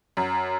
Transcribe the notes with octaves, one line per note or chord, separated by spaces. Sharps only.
F#2